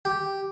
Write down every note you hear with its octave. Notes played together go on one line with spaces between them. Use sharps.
G4